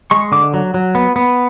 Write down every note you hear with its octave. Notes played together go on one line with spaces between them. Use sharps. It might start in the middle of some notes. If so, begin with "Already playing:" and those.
G#3 C#6
D3 D6
F#3
F#3
B3
B3